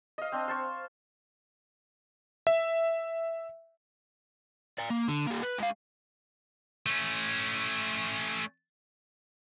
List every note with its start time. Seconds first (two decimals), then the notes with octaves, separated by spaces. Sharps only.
0.18 D#5 F5
0.32 C4 D4
0.48 C5 A5 C#6
2.47 E5
4.78 D5 F5
4.90 A#3
5.08 D3
5.27 G3 A#3
5.43 B4
5.59 G#3 F5
6.86 A3 C#4